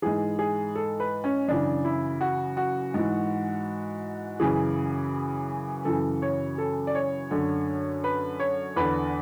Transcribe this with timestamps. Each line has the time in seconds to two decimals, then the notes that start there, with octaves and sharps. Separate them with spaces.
0.02 G#2 E3 G#4
0.39 G#4
0.75 A4
1.00 B4
1.24 C#4
1.48 F#2 C#3 E3 D4
1.85 E4
2.21 F#4
2.57 F#4
2.94 G#2 E3
4.40 F#2 C#3 E3 G#4
5.85 F#2 C#3 E3 A4
6.22 C#5
6.58 A4
6.87 D5
6.95 C#5
7.31 F#2 D3
8.04 B4
8.40 C#5
8.76 E2 D3 B4